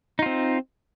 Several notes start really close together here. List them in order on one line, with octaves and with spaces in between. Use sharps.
D#4 F4 C4